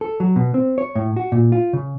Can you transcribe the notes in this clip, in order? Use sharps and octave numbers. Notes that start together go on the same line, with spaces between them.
A4
F#3
B2
C4
C#5
A2
F#4
A#2
F4
C#3